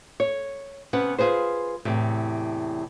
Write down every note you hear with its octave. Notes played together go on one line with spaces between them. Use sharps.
C#5
C3 B3 C#4 B4 F#5
F4 G#4 B4 C5
E2 A2 C3